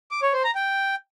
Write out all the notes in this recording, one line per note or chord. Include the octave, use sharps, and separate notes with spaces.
D6
C#5
C5
A#5
G5